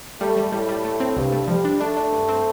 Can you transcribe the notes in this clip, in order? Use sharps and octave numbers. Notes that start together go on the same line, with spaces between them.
G3 A3
G3
A2 G3
G3
A3
C4
C2 G2
A3
F3 G3
D4
A3 D4
D4
G2
C4